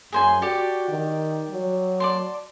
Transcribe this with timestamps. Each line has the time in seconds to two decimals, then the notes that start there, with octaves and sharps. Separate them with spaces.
0.12 F#2 G#4 C5 G#5
0.42 F#4 G4 A4 D5
0.89 D#3
1.50 F#3
2.00 D5 A5 C6